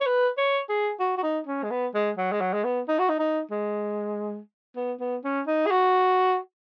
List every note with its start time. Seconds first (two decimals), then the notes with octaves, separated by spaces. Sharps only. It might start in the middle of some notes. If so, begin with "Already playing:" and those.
0.01 C#5
0.06 B4
0.38 C#5
0.69 G#4
0.99 F#4
1.17 F#4
1.23 D#4
1.47 C#4
1.64 G#3
1.70 B3
1.94 G#3
2.17 F#3
2.32 G#3
2.41 F#3
2.53 G#3
2.64 B3
2.88 D#4
2.99 F#4
3.09 D#4
3.19 D#4
3.51 G#3
4.76 B3
5.00 B3
5.24 C#4
5.47 D#4
5.66 G#4
5.71 F#4